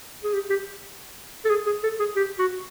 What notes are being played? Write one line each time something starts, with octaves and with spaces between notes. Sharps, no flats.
G#4
G4
G4
A4
G#4
G#4
A4
G#4
G4
F#4